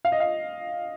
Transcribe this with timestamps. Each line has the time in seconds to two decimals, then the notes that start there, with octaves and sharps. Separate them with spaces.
0.05 F5
0.12 D#5
0.20 F5